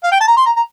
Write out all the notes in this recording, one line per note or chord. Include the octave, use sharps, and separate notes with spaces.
F5
G5
A5
A#5
C6
A#5
A#5